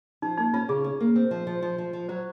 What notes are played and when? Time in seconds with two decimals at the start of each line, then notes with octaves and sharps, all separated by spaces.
0.22 F3 D#4
0.37 A#3 D#4
0.54 C#4 F4
0.69 C#3 G#4
0.84 C#4
1.00 A#3
1.16 C4
1.31 F3
1.47 F3
1.62 F3
1.78 F3
1.93 F3
2.09 F#3 C5